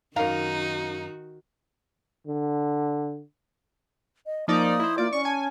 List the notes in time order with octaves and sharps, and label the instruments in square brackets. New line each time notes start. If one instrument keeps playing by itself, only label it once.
[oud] F#2 F5 [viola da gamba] D#3 F#4 [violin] D#4 [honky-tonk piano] A#4 A#5
[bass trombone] D3
[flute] D#5
[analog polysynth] F3 D#4 D5 [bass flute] A#3 [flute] D#6
[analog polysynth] E4 C5
[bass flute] A#3 [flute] F4 [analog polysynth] D5
[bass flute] C#4 [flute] D5 [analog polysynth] C#6
[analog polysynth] G#5 [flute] A5